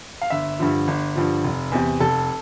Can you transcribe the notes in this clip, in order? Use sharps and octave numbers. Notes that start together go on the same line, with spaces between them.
F5
G1 E5
G2 D3 F3
G1
G2 D3 F3
F1
E2 C3
F1 A4